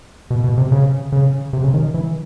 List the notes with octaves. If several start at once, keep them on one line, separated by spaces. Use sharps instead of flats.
B2
B2
C3
C#3
C#3
C3
C#3
D#3
E3